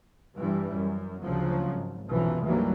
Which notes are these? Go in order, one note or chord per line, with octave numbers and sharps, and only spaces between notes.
G2 E3 G3
F#2
D2 C#3 F3 F#3
G#1
B1 F#2 C3 E3 F3
D2 G#2 E3 F#3 G3 A#3